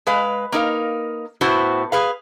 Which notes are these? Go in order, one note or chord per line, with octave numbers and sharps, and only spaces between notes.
G#3 B4 F5
A#3 D#4 A#4 F5
A2 B3 E4 F#4 C5
G#4 B4 F5